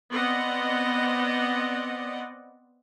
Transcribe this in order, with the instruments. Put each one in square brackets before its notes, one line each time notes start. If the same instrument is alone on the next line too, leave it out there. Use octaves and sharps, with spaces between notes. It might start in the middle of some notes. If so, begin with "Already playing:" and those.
[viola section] B3 C4 D5 D#5 F#5